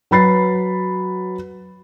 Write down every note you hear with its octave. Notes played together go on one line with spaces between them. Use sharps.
F#3 B4 B5 A6 C7